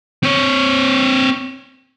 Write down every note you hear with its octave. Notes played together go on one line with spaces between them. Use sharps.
C4 C#5